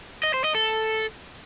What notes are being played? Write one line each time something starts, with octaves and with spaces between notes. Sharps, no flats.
D#5
C5
D#5
A4